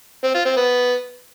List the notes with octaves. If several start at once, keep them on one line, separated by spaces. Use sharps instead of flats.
C4
F4
C4
B3